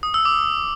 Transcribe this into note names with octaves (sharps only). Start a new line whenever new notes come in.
D#6
E6
D6